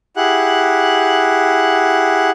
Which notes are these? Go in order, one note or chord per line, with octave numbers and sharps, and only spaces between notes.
E4 G4 G#4 F#5 F#6